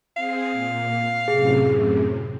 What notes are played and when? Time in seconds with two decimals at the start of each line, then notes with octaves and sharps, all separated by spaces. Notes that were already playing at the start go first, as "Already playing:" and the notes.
0.17 C4 G#4 F5
0.52 A#2
1.28 F#2 A2 C3 G#4